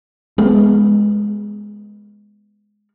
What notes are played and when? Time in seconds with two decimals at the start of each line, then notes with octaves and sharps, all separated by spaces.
0.38 G#3 B3